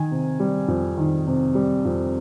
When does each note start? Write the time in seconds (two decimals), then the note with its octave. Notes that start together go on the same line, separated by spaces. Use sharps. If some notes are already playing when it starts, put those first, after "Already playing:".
Already playing: D#3 G#5
0.11 C3
0.40 G3
0.68 F2
0.97 D#3
1.27 C3
1.55 G3
1.85 F2